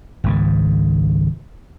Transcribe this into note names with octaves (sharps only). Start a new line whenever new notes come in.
G#1 C#2 G#2